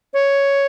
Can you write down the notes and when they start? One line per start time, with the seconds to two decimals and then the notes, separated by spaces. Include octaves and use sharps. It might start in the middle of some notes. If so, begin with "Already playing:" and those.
0.14 C#5